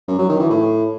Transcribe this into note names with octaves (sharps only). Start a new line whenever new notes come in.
F#2
F#3
D#3
E3
A2